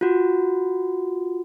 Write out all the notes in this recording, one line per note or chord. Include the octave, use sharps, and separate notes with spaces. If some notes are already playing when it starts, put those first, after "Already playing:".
F4 F#4